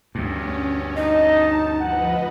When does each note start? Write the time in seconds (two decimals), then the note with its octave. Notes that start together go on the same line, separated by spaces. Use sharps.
0.15 D2 G2 C#4
0.97 D#4 D#5 A5
1.81 F3 B4 D#5 F#5